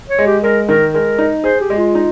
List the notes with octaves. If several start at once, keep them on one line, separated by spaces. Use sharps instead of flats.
C#5
G#3
G4
G#3 A#4
D#3 A#4
G#3 A#4
D#4
G#4 C5
G4
G#3
F4
D#4